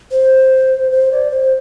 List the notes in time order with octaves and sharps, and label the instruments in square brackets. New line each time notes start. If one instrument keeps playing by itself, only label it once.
[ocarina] C5
C5
D5
C5